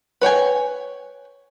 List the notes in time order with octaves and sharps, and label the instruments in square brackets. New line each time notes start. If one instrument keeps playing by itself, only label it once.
[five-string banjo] B4 C#5 G5 G#5